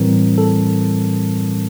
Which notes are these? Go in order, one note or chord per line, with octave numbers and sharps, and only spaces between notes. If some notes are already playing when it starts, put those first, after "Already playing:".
Already playing: A2 E3 G3 C4 A#4
A4